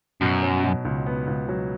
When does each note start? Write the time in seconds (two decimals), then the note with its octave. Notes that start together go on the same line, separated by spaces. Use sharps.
0.21 F#2 B2
0.43 F#3
0.64 B2
0.85 C#2
1.06 B3
1.27 C#2
1.49 F#3